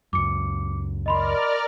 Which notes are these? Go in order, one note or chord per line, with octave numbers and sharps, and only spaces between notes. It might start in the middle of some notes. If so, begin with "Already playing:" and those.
C#2 F#2 D6 C#7
A#4 D5 D#5 B5 C6 F6